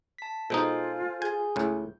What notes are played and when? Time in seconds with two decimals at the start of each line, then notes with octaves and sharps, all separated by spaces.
0.18 A5 B6
0.50 B2 G#3 D#4 F4 A4 C5 G#5
1.22 G#4 G#5 G6
1.56 C#2 A2